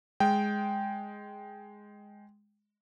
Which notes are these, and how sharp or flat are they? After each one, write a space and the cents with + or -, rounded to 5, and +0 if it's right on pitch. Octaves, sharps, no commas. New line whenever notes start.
G#3 +0 G5 -5